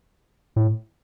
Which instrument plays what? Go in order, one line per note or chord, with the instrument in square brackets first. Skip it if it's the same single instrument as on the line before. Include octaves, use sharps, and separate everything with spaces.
[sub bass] A2